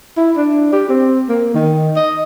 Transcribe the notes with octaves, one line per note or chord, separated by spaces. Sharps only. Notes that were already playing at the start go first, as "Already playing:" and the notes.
E4
D4
G4
C4
A#3
D#3
D#5